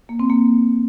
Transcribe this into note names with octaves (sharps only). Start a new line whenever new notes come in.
A#3
C4
A#3